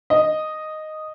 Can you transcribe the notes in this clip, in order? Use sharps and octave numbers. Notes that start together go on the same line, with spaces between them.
D#5